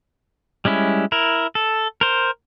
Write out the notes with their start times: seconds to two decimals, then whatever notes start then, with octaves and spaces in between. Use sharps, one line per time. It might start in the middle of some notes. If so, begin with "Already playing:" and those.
0.65 G3 G#3 C#4 E4
1.12 E4 A#4
1.55 A4
2.01 A#4 C5